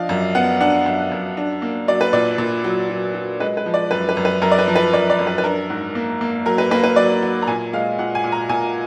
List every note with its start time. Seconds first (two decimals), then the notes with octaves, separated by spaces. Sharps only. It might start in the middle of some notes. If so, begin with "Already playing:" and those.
Already playing: F3 D4 D5 D#5 F5
0.09 F#2
0.35 B3 F#5
0.61 D4 F#5
0.86 F#2 F#5
1.12 F#2
1.37 D4
1.62 A#3
1.88 F#3 D5
2.01 B4
2.13 A#2 D5
2.38 A#2
2.64 F#3
2.90 F#3
3.15 F#3
3.40 G#3 B4
3.57 B4
3.66 F3
3.74 D5
3.91 F#2 B4
4.09 B4
4.17 F#2
4.25 B4
4.42 F#2 A#4
4.51 D5
4.59 B4
4.68 F3
4.76 B4
4.93 F#2 D5
5.10 D5
5.19 F#2
5.27 B4
5.38 B4
5.44 D4 A#4
5.70 G#2
5.95 A#3
6.21 A#3
6.46 F#3 A#4
6.58 B4
6.71 A#3 B4
6.84 B4
6.96 F#3 D5
7.22 F#3
7.42 A#5
7.47 A#2 G#5
7.73 G#3 F5
7.99 A#2 F#5
8.15 G#5
8.24 A#2
8.32 A#5
8.49 A#2 G#5